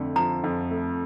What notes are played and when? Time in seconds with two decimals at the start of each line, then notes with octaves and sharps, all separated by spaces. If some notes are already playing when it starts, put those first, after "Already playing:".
Already playing: F2 D3 A3
0.16 F3 A#5
0.44 F2
0.71 A3